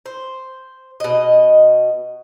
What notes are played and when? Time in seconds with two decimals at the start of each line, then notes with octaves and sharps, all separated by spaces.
0.06 C5
1.00 B2 D#5